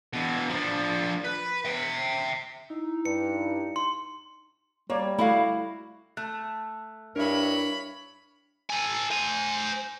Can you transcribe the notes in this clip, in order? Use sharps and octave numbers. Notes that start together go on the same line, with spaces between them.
B2 E3
F3 D4
B4
E5 G5
D#4 E4
G2 C#7
C6
G3 A#3 C#5 D5
A3 E4 F#4 F5
A3 F#6
G2 D4 E4 A#4 C#5 B5
A4 G#5
C5 G#5